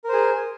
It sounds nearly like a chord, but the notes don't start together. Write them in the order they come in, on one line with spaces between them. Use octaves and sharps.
A#4 C5 G#4